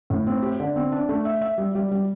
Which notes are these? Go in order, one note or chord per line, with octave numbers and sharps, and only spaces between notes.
A2
C4
G4
D3
C4
D4
A3
E5
E5
G3
G3
G3